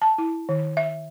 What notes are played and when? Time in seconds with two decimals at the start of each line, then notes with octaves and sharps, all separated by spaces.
0.02 A5
0.18 E4
0.49 D#3
0.77 E5